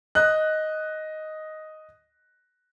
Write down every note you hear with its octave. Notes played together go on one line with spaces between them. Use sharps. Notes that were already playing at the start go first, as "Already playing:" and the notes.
D#5 F#6